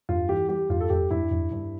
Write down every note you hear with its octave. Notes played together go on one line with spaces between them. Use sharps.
G2 F4
E3 G4
G3 G4
G2 F4
A4
G2 G4
G2 E4
G2
G2